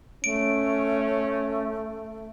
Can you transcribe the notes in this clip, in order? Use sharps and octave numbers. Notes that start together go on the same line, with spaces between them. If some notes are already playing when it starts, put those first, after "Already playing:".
A3 C#4 D7